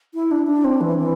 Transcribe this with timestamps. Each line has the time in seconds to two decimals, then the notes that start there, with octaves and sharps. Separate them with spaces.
0.14 E4
0.31 D4
0.47 D4
0.65 C4
0.81 E3
0.98 E3